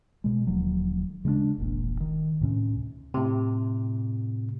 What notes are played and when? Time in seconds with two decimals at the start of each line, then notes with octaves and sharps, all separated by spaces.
0.24 B2 G#3
0.47 D1 D#2 F3 F#3
1.25 C#3 G#3 A#3 D4
1.58 E1 A#1 A#2
2.00 D#3
2.41 D2 A2 C3 C#4
3.14 A2 C3